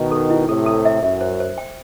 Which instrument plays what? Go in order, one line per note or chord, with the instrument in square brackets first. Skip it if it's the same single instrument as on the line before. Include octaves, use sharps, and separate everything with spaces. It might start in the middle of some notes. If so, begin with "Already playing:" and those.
Already playing: [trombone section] B2 D#3
[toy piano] A4
E4
[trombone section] A2 C3 [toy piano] A4
[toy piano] A4
E5
[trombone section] F#2 [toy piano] E5
[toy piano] C5
C5
G5